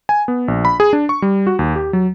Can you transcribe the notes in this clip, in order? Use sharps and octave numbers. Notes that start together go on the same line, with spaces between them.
G#5
B3
A#1
B5
G#4
D4
C#6
G3
F#4
D#2
G4
F#3